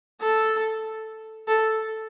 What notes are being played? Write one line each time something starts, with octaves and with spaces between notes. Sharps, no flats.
A4
A4